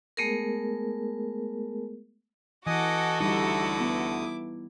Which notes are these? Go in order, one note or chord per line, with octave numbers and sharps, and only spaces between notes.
G#3 A3 B3 G#4 A#4
E3 F#4 A4 D#5 F#5 G#5 D6 D#6
D2 D3 G3 D#4 E4 D6 D#6
B3